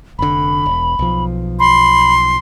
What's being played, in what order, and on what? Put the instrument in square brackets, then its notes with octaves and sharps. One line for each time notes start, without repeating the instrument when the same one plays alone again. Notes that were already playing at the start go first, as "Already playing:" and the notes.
[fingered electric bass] F1 D3 [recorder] B5
[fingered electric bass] E1
B1 F3
[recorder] B5 [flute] C6